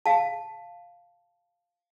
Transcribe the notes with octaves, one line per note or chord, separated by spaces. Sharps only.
F5 A5